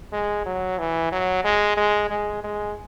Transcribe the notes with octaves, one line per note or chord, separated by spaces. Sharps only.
G#3
F#3
E3
F#3
G#3
G#3
G#3
G#3